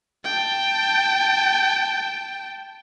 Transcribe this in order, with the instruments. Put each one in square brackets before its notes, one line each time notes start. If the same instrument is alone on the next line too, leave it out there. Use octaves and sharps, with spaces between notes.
[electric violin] G5 A5